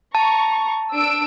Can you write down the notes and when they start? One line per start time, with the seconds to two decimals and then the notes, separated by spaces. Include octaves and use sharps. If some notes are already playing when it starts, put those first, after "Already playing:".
0.15 A5 A#5 C#6
0.92 D4 E6 D7